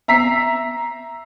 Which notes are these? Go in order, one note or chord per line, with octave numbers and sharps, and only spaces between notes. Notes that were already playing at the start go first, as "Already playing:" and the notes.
E5 A#5 E6 B6 C7